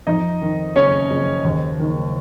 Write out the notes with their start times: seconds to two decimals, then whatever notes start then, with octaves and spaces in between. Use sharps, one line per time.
0.07 F2 D#4 D#5
0.42 D#3
0.76 F#1 C#4 C#5
1.11 F#1
1.44 D#2
1.79 D#3